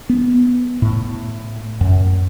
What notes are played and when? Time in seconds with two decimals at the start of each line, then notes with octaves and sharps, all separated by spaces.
0.09 B3
0.82 A2
1.81 F#2